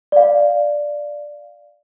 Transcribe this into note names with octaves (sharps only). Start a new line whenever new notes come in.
D5 F5